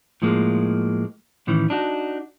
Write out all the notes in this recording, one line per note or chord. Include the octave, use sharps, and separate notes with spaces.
A2 F3 G#3 A#3
A2 D#3 E3 C#4
D4 D#4 F#4